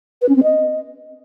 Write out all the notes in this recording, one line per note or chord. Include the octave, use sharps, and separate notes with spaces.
B4
C#4
C4
D#5